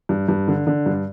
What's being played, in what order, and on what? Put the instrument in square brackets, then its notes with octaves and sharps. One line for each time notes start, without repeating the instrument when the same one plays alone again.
[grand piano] G2
G2
D3
D3
G2